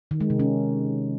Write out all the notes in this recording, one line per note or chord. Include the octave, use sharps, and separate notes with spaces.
D#3
G#3
C3
C#4